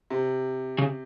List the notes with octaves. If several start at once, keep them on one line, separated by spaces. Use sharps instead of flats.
C3
C#3